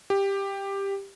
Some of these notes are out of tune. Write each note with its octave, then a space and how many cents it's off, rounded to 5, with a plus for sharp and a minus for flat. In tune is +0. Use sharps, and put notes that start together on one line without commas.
G4 +10